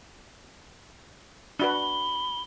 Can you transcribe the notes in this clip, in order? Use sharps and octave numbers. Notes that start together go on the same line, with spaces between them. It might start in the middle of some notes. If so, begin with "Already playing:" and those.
D4 F#4 B4 B5 G7